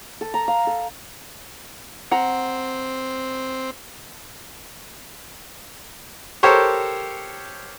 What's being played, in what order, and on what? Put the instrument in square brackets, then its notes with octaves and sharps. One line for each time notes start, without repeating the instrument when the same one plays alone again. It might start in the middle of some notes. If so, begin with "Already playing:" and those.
[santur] A4
A#5
F5
A4
[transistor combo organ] C4 [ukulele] F#5 A#5
[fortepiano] G4 A4 A#4 C5 C#5